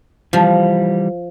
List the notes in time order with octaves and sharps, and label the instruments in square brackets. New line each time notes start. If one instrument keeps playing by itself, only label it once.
[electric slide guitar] E3 G3 [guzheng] F3